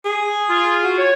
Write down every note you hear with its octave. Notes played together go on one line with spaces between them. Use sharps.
G#4
F4
F#4
C#5